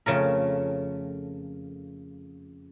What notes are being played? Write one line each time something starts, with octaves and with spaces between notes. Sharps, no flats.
F2 C#3 A3 A#4